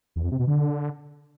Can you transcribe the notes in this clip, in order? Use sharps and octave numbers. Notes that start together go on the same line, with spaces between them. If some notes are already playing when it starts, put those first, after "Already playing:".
E2
F2
C3
B2
D3